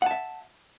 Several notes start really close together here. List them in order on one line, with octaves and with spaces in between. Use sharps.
F#5 A5 E5